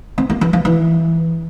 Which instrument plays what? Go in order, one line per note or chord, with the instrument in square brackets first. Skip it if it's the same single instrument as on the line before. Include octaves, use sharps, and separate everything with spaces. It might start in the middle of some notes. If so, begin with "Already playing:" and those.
[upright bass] C4
A#3
E3
F3
E3